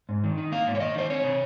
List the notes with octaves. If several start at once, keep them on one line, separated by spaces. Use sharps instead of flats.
G#2
D#3
D#4
A#3 F5
G#2
C#5
D#3 D#5
D#4 C5
C4 C#5
C3